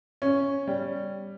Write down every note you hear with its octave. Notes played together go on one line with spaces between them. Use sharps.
C#4
G3